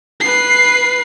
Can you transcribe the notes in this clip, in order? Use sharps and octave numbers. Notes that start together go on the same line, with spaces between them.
B4 C7